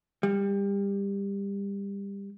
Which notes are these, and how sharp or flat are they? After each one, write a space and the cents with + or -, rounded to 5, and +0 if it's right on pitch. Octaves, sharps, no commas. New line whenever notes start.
G3 +25